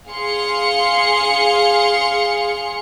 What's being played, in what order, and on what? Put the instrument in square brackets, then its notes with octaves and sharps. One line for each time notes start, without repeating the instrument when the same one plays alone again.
[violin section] G#4 F5 C6 C#7